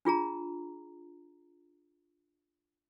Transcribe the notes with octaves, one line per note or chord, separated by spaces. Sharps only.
D4 F4 G#4 A#5